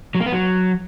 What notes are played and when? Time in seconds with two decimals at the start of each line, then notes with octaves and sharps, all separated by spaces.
0.15 F#3
0.20 A#3
0.26 B3
0.32 F#3